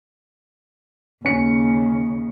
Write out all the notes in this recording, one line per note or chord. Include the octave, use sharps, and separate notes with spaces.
D#2 C#3 C#4 C#7